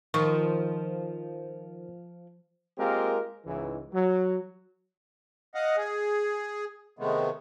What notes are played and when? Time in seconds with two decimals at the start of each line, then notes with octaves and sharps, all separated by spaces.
0.14 D#3 F3 C#6
2.78 G#3 A#3 C4 F4 G4 A#4
3.46 C#2 G#2 E3
3.93 F#3
5.55 D#5 F5 F#5
5.77 G#4
6.99 C3 D#3 G#3 A3 B3